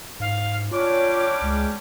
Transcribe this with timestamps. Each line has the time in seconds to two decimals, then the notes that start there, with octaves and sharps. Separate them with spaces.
0.20 G#2 F5
0.71 G3 C#4 D4 F4 C#5 D6
1.42 C#2 G#3